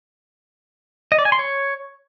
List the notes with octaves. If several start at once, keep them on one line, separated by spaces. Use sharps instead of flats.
D#5
D5
G#5
C6
C#5